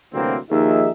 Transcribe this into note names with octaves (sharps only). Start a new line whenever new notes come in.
D2 C3 E3 F#3 A#3 C4
D#2 F3 D#4 G#4 E5